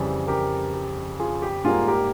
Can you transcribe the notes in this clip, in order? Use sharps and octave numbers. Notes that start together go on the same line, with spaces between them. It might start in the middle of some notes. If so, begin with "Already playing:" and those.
Already playing: F2 C#3 E3 G3
G4 A#4
G4
F4 G#4
G4
G#2 G3 A#3 F4 G#4
G4 A#4